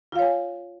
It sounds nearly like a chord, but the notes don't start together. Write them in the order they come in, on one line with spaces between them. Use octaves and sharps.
F4 F5 C#5 G#5